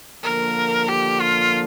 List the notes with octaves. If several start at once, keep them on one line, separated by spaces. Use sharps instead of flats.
D3 F3 A#3 A#4
G4
F4